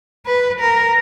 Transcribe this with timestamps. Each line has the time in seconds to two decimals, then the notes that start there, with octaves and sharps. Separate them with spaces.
0.26 B4
0.60 A#4